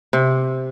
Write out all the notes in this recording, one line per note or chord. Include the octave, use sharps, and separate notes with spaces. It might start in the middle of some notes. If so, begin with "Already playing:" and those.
C3